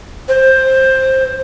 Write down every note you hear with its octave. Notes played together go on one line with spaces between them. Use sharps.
C5